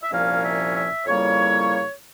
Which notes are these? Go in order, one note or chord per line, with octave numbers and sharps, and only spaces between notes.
E5
C2 A#2 F3 A#3 C#4 F5
E5
E5
F2 C#3 G3 A#3 E4 C#5